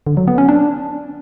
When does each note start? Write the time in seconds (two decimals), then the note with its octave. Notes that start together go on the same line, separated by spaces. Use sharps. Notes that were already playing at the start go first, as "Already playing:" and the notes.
0.07 D3
0.17 F#3
0.28 B3
0.38 C#4
0.49 D4